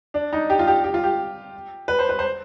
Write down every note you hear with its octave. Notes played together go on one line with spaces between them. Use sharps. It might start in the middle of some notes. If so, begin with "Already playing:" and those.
D4
D#4
G4
F4
G4
G4
F4
G4
B4
C5
B4
C5